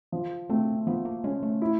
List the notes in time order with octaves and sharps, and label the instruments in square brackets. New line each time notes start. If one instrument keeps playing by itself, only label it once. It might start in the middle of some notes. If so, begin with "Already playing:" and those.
[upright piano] F3
[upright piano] A3 [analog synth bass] C4
[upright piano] F3 [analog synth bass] B3
[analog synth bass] A#3
[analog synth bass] G#3 [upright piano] C#4
[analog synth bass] A3
[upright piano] E4